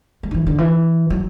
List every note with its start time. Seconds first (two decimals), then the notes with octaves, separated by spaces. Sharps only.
0.23 F#3
0.31 D3
0.34 E3
0.47 D3
0.58 E3
1.10 F#3